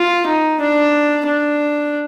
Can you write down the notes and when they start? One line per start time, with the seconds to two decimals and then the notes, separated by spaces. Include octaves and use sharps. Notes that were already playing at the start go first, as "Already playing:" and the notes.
Already playing: F4
0.27 D#4
0.61 D4
1.27 D4